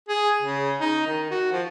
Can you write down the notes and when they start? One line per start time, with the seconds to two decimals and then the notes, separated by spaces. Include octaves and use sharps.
0.09 G#4
0.42 C#3
0.81 D#4
1.07 D#3
1.31 F#4
1.52 F3